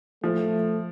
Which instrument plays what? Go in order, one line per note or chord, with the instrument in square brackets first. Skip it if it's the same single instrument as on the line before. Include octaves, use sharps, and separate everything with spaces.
[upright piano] F3 [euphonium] A3